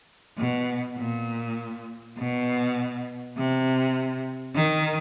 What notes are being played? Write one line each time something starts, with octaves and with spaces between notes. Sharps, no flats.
B2
A#2
B2
C3
D#3